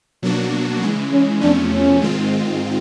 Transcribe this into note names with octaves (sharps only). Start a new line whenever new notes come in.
B2 F#3 A#3 D4 F#4
C#3 E3 G#3
C#4
E2 C3 F3 A3 C#4 D4
C#4
G#2 D#3 G#3 C4 F4